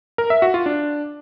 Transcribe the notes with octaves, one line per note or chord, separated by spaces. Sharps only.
A#4
E5
F#4
F4
D4